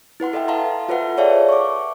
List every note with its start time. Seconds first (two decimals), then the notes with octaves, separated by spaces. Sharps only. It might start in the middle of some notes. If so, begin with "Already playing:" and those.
0.20 E4 B4 F#5 C6
0.33 A4 D#5 E5 G5
0.48 D#5 F5 A5 A#5 C6
0.89 F4 A4 B4 C5 E5 F#5
1.17 G#4 C#5 D5 E5 F5 A5
1.49 C#6 D6